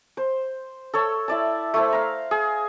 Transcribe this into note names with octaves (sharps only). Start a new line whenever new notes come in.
C5
A4 C#5 E6
E4 D5 A5
A3 E4 C5
F5 A#5
G#4